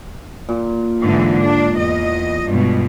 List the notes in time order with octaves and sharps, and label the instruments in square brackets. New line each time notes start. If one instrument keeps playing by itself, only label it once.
[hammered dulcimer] A#2
[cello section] G#2 D3 E3
D4
E2 D#5
G2 B2 G#3